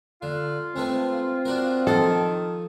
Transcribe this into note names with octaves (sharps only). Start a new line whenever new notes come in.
D3 F4
G#3 A3 C4 B4
D4 F#4 A#4
D#3 F3 A4 C5 D#5